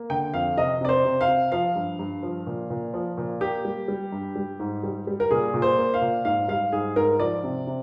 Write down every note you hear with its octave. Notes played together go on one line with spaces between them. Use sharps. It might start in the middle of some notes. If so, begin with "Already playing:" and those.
Already playing: A#3
D3 G5
F2 F5
C3 D#5
C3 D5
C5
C3
F5
C3
F3 F5
G2
G2
F3
A#2
A#2
F3
A#2
A#3 G4
G3
G3
G2
G3
G#2
G3
G3
A#4
A#2 G#4
A#2
C5
A#3
F5
A#2
G#2 F5
G3 F5
G#2 G#4
G#2 A#4
F3 D5
C3
C3